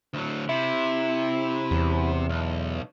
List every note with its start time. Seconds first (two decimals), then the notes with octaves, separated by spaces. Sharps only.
0.14 D2 F#3
0.49 C3 E4
1.71 E2
2.29 B1